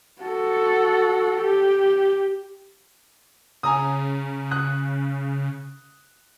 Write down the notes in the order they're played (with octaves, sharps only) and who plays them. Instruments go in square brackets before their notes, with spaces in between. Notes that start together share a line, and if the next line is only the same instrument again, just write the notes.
[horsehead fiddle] F#4 A4
G4
[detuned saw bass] C#3 [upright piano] G#5 A#5 D#6
[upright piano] D#6 F#6